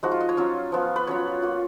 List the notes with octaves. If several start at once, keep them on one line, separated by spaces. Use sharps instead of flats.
F3 G#3 D#4 F#4
F4
D#5
C#5
F#3 C#4 F4
F3 B3 F4
B4
F#3 C#4 F4 C#5
A#3 F4